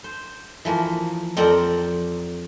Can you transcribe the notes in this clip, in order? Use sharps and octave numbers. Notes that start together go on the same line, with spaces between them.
C5
E3 F3 A#3 F#4
F2 C4 A#4 D5 F#5 A#5